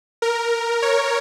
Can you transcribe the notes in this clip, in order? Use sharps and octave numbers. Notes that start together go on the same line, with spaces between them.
A#4
C#5